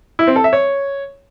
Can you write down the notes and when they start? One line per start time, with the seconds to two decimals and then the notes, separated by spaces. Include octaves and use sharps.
0.19 E4
0.27 C4
0.36 A4
0.44 E5
0.53 C#5